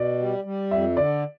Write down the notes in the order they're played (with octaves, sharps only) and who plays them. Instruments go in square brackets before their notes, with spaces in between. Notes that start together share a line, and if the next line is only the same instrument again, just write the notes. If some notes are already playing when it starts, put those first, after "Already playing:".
Already playing: [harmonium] B2 [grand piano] D5
[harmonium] G3
G3
[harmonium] F2 [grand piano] E5
[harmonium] D3 [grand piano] D5